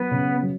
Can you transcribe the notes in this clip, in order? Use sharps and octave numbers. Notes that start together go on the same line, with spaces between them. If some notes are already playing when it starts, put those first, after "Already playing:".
Already playing: F#3 B3 B4
C#3
F#3